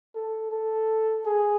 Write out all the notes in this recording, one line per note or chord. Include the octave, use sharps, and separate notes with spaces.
A4
A4
G#4